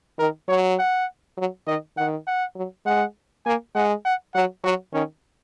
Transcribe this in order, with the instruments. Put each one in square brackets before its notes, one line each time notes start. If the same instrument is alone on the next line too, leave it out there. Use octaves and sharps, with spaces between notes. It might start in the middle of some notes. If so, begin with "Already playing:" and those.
[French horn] D#3 [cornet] A#4
[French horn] F#3 [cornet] C#5
[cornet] F#5
[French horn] F#3
[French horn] D#3 [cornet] D#5
[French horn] D#3 [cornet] F#5
[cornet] F#5
[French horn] F#3
[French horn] G#3 [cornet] F#5
[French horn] A#3 [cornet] G#5
[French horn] G#3 [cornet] F#5
[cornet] F#5
[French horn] F#3 [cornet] F#5
[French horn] F#3 [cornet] F#4
[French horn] D#3 [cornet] C#4